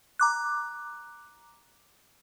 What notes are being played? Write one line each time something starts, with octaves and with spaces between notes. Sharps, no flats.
A#5 D6 F#6